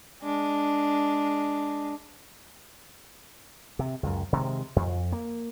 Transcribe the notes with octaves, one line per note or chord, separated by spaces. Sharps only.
G#3 D4
C3
C#2 F#2
C3 D#3 F#3 G#3
F2
A#3